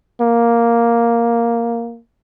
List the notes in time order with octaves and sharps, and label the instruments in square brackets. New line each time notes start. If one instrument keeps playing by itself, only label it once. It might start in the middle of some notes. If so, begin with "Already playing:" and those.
[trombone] A#3